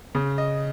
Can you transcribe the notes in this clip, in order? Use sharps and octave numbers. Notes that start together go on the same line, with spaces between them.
C#3
D#5